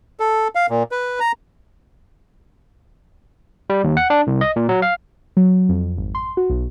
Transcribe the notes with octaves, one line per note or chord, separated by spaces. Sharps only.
A4
F5
A#2
B4
A#5
G3
D#2
F#5
D4
C2
D#5
A#2
F#3
F5
F#3
F2
G#1
C6
F#4
B1